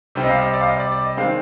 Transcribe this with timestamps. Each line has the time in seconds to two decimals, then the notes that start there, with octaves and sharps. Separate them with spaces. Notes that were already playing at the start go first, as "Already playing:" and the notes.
0.15 C3 G3 C4
0.24 D#5
0.29 F5
0.41 D#5
0.54 D5
0.61 F5
0.67 D#5
0.80 D5
0.92 D5
1.05 D#5
1.17 D#3 G#3 C4 F5